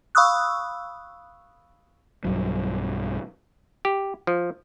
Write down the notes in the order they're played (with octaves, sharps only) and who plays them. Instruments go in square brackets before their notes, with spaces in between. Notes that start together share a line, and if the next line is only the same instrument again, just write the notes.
[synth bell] F5 B5 C#6 D#6 E6 F#6
[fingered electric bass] B1 G2 F#3
[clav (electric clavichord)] G4
F3